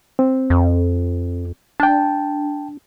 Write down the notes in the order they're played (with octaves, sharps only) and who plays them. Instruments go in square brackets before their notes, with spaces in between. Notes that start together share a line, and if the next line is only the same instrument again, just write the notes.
[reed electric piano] C4
[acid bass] F2
[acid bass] D4 [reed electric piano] G5 A5